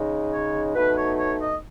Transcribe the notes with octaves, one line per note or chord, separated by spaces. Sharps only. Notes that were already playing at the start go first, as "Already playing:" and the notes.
Already playing: C#3 G#3 D#4
C#5
B2 A3 D#4 B4
C#5
C#5
D#5